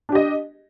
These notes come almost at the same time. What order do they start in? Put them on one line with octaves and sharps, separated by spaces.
D4 G4 D#5